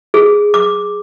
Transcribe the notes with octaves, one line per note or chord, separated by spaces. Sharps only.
G#4
D6